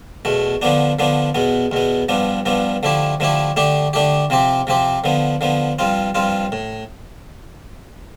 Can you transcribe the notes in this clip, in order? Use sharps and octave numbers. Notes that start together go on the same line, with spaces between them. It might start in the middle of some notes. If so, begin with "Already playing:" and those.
E2 B2 A3
D3 F3 B3 D4
D3 F3 B3 D4
E2 B2 B3
E2 B2 B3
G2 F3 B3 D4
G2 F3 B3 D4
D3 F3 A3 E4 G4
D3 F3 A3 E4 G4
D3 A3 D4 G4
D3 A3 D4 G4
C3 F3 C4 G4
C3 F3 C4 G4
D3 F3 B3
D3 F3 B3
G2 F3 C4 F4
G2 F3 C4 F4
A2